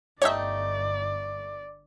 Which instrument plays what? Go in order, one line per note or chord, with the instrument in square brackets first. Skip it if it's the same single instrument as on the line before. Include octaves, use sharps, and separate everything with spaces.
[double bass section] G1 [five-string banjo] A3 D#4 G4 [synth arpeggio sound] C#5 E5 [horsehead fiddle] D5